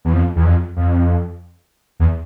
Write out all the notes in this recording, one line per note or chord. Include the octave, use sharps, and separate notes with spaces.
E2
F2
E2
F2
F2
E2